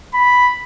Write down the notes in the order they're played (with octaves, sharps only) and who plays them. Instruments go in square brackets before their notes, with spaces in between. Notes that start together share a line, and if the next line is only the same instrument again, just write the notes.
[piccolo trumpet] B5